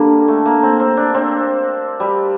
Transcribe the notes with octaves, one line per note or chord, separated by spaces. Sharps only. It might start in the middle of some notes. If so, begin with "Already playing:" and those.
Already playing: D3 G3 A#3
A3
A#3
C4
C4
D4
C4
G3